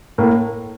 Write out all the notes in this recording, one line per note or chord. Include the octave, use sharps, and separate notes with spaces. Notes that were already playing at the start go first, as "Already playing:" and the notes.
A2 A#3